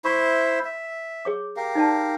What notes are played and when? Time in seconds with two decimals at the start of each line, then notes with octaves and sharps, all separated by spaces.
0.05 E4 C5 E5 C#6
0.65 E5
1.25 G#4 C#5 D6
1.56 G4 A#4 F5
1.75 D#4 D5 A5